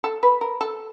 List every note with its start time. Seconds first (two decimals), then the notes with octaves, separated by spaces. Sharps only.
0.04 A4
0.23 B4
0.41 A#4
0.61 A4